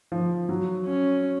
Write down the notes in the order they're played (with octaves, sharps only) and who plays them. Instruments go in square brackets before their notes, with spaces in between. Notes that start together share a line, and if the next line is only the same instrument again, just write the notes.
[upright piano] F3
F#3
[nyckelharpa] C#4